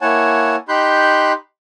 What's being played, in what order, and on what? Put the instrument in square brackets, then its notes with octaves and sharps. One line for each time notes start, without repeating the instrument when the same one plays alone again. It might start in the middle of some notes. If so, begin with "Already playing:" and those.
[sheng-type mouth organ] A#3 E4 C#5 F#5 G#5 A5
D#4 G4 B5 C6 F#6 G6